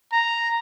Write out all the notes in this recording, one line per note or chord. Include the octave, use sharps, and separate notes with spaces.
A#5